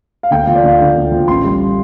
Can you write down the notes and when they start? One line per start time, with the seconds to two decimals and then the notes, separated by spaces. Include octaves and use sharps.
0.23 F5
0.31 D2 G5
0.44 F3 F5
0.55 D5
0.63 D2 F5
0.80 D3
0.96 D2
1.12 F3
1.28 A1 C6
1.44 G3